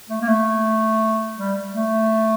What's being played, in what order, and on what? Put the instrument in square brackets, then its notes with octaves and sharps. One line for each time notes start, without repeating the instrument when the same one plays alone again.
[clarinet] A3
A#3
A3
G3
A3